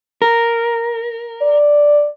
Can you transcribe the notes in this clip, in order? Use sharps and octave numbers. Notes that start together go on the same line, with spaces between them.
A#4
D5